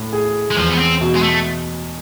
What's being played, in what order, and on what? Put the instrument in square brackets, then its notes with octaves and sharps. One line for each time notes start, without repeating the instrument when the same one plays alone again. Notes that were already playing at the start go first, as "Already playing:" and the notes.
Already playing: [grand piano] A2
G#4
[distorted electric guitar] G#3
[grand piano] E2 [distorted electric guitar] F3
[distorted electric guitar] B3
C4
[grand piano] B2
[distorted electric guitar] G#3
A3